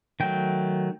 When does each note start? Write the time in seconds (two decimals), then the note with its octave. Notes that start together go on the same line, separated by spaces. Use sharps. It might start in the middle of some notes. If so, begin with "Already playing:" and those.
0.20 D#3 F#3 A3 G5